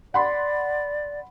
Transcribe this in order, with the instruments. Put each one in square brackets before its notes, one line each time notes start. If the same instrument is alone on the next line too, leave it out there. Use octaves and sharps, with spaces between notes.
[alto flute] D5 [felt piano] F#5 B5 C6